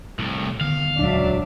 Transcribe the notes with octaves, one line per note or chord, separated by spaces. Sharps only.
C2 A2
D3 D#3 B3 F5
D#1 C#2 F#3 G#3 D4 E5